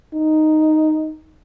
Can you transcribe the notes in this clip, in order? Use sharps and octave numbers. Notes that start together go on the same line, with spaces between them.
D#4